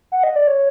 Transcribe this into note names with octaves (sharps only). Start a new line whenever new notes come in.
F#5
D#5
D5
C#5